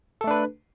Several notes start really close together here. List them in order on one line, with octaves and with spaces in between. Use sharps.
A4 A3 D4 B4